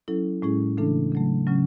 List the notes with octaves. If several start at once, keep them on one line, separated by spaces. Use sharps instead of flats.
F#3 C#4 E4 A4
A2 G#3 C#4 E4 G#4
C#3 E3 A3 D4 A4
C#3 F#3 A3
C#3 F#3 C#4